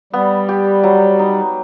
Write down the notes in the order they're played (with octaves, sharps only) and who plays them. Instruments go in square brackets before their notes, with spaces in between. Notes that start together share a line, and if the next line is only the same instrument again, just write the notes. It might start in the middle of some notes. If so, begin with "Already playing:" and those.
[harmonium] G3 [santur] B3
[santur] G4
F#3
D#4